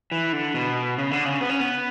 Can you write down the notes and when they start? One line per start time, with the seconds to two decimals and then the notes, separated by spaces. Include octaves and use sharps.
0.12 E3
0.33 D3
0.54 B2
0.98 C#3
1.11 D3
1.25 C#3
1.41 B3
1.50 C#4
1.60 B3